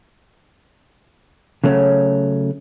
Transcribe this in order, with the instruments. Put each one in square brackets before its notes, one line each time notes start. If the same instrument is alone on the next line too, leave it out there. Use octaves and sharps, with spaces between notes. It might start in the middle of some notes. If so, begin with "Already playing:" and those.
[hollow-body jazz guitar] C#3 F#3 A3 C#4